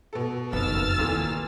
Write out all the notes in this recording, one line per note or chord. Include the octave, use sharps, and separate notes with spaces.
B2 A4
F#1 F2 D#3 B3 E6 F6 A6
D#2 A#2 D3 E3